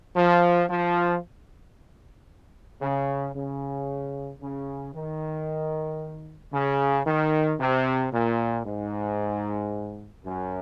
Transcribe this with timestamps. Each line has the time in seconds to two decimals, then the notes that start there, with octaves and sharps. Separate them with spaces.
0.16 F3
0.69 F3
2.82 C#3
3.35 C#3
4.41 C#3
4.95 D#3
6.53 C#3
7.07 D#3
7.59 C3
8.13 A#2
8.65 G#2
10.25 F#2